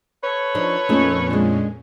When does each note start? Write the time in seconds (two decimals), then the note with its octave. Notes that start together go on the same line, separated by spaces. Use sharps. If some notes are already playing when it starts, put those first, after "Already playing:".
0.24 A4 B4 C#5
0.55 F3 D4 D#4
0.89 F2 A#2 A3 C#4 D#4
1.31 G#3 D4